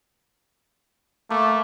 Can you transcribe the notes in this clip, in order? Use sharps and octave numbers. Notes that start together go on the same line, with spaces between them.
A3 A#3